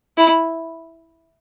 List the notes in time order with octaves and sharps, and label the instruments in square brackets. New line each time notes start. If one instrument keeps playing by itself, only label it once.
[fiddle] E4